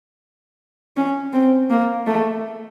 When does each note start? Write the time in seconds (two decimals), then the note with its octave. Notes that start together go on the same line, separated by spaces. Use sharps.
0.96 C#4
1.33 C4
1.70 A#3
2.07 A3